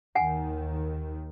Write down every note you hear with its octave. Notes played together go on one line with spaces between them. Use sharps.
D#2 D#3 F#5 G#5